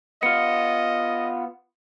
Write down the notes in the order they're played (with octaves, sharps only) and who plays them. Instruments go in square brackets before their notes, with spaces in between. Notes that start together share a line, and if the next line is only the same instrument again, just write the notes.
[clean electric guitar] B3 F4 [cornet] D#5 [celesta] C#7